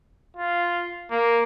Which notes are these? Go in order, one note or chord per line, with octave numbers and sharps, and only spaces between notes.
F4
A#3